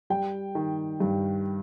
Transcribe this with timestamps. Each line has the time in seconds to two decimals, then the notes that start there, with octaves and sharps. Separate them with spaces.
0.10 G3 G5
0.55 D#3
1.00 G2